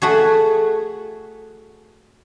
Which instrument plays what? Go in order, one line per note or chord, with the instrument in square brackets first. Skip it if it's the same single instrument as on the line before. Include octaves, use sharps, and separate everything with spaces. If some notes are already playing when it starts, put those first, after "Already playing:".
[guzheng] A3 F#4 G#4